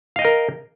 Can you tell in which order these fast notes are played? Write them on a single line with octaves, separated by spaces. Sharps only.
F5 D#5 G5 A#4